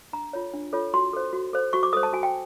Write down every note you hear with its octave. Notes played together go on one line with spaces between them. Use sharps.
D4 A#5
F4 A4 C#5
D4
F4 A4 C#5
F#4 C6
A4 C5
F#4
A4 C5
F#4 C#6
D6
A4 C5 D#6
A5
F#4 G#5
G5